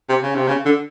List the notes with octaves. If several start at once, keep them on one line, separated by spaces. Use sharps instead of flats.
C3
C#3
C3
C#3
D3